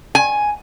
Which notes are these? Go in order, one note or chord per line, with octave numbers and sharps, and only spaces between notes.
G#5